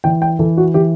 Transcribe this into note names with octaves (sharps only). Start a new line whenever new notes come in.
E3 G5
G5
E3 A4
F#4
E3 G4